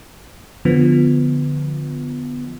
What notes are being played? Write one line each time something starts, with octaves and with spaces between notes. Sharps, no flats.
D3 F3 B3